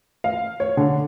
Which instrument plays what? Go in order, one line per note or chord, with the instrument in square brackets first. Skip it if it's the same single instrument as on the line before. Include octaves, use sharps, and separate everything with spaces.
[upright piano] F5
C#5
D3